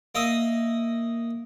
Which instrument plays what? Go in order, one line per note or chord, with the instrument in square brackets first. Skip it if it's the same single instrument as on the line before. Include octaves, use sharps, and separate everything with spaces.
[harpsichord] A#3 D#5 E5 D#6